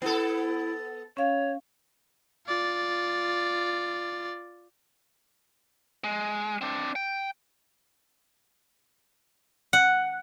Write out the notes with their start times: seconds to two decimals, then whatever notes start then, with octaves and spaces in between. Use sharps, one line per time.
0.02 B3 E4 A4
1.17 C#4 C#5 F5
2.47 F4 D5
6.04 G#3
6.61 C4 D4
6.96 G5
9.73 F#5